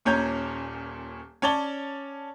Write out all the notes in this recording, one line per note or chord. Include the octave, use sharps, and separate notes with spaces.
D#1 A#2 C#4 C#5 A#5 G6
C#4 C#5 D5 A5 G7